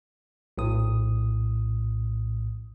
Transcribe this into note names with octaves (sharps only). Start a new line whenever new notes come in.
A#1 A2 D#6